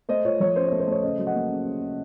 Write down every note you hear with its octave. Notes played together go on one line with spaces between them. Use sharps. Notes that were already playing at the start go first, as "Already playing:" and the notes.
A3 C5 D#5
F4 C#5
F3 C#5
C#4 C5
A3 C#5
C5
A3 C#5
C#3 C5 D#5
F#3
D#5 F#5
A#3
C#3
C#3
C#3